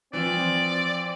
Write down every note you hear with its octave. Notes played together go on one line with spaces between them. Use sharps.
E3 F3 C4 D5